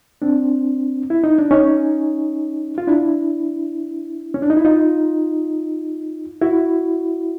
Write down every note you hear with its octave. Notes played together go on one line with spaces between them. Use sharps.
C4 D4
E4
D#4
D4
C#4 D#4
F4
D4 E4
C#4
D4
D#4
E4
D#4 F4
E4 F#4